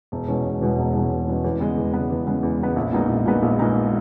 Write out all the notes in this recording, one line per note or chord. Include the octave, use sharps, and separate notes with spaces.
E1
E2 B2 G#3 C#4
E1
E2 B2 G#3 C#4
E1
E2 B2 G#3 C#4
E1
E2 B2 G#3 C#4
E2
C#3 G#3 B3
E2
C#3 G#3 B3
E2
C#3 G#3 B3
E2
C#3 G#3 B3
A#1
A#2 G#3 B3 D#4
A#1
A#2 G#3 B3 D#4
A#1
A#2 G#3 B3 D#4